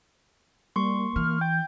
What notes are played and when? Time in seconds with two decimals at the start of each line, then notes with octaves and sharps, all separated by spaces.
0.76 G3 A#3 C6 C#6
1.16 E3 F6
1.41 G5 G6